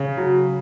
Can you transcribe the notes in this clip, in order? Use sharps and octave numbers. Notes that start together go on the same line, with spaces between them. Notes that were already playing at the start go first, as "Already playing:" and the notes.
Already playing: C#3
F#3